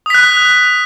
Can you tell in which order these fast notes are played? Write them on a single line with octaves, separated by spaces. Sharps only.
D#6 B6 F#6